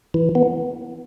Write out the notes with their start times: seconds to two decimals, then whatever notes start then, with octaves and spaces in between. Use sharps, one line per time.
0.14 E3
0.35 B3